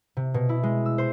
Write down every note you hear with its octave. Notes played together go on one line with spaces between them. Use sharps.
C3
B2
E4
G#3
E6
C5